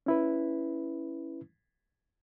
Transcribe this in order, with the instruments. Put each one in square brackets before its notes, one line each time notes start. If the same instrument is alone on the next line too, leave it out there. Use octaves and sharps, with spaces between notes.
[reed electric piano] C#4 E4 B4